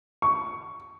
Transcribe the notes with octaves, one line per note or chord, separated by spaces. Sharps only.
C#6